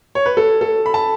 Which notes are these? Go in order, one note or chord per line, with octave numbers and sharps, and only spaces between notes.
C#5
B4
A4
A4
B5
A5